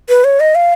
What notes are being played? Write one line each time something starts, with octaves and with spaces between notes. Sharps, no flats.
B4
C#5
D#5
F5